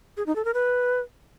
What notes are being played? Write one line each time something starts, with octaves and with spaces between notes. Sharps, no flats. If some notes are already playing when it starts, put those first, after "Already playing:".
G#4
D#4
A4
A#4
B4